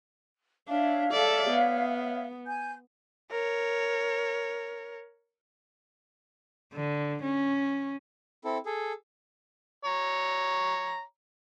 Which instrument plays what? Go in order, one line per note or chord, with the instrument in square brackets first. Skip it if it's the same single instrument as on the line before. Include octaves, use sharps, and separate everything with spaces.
[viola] D4 [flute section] C#5 E5 F5
[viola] A4 D5
B3
[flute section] G#5 G6
[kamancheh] A#4 C#5
[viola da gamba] D3
C#4
[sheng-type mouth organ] C4 E4 A4
G#4 A4
[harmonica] C#5 A#5